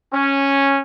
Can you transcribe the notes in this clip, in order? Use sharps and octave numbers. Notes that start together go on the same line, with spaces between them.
C#4